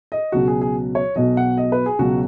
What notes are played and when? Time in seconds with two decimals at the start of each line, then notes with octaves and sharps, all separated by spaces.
0.12 D#5
0.32 C#2 B2 F#3 F#4
0.47 G#4
0.61 G#4
0.95 C#5
1.16 B1 B2 F#3 D#5
1.37 F#5
1.57 D#5
1.72 B4
1.86 G#4
1.99 C#2 B2 F#3 F#4